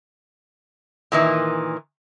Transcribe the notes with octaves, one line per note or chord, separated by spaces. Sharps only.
A#2 D#3 E3